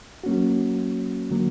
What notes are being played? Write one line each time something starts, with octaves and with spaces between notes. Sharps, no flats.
F#3 A#3 C#4 F#4
D3 F#3 A#3